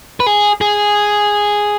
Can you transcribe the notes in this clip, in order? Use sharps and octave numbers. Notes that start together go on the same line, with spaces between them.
B4
G#4
G#4